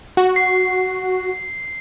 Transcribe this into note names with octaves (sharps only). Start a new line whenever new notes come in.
F#4
C7